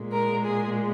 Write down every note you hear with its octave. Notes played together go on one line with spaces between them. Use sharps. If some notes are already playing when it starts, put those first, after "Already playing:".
Already playing: A#2 G#3
A#4
G#4